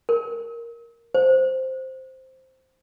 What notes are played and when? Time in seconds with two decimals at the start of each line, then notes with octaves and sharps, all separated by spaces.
0.09 A#4
1.14 C5